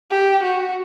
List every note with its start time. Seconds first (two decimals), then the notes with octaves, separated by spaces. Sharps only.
0.11 G4
0.43 F#4